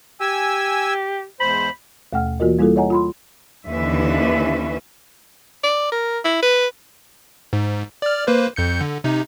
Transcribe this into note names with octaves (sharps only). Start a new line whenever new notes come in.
G4 G#5 E6
E2 G#2 C5 B5
D#2 B2 A3 F#5 G5 F6
E3 A#3 F4 F#4 A#4 D#5
G3 A#3 E4 F4 G#4 A4
C#5 D#5 F#5 G#5 A#5
F4 B5 C6
D#2 D3 E3 C#4 B4 E5
D5
A#4
E4
B4
G#2
D5 F6
A#3 B4 C5
F2 G6 C#7
D3
C3 D#4